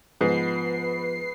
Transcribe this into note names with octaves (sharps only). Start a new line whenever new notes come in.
G#2 F3 B3 B4 C7